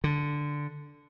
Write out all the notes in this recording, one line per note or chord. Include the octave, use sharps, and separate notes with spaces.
D3